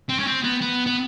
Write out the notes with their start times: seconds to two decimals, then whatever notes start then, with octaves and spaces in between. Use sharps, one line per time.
0.09 C4
0.20 C#4
0.28 C4
0.44 B3
0.62 B3
0.87 B3